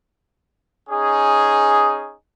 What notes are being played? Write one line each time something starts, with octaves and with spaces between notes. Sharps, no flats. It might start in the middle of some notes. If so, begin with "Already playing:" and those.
C#4 D#4 G#4